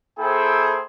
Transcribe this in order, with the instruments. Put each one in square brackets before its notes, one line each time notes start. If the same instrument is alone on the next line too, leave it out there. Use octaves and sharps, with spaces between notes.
[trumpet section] A#3 E4 G#4 A4 C5 G5